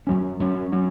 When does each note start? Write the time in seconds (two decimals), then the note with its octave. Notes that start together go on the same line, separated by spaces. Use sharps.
0.07 F#2 F#3 C#4
0.39 F#2 F#3 C#4
0.72 F#3 C#4